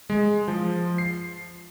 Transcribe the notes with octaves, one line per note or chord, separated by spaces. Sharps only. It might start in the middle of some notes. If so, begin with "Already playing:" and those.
G#3
F3
C7